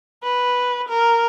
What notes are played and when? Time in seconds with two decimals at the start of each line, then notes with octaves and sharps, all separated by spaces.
0.23 B4
0.89 A#4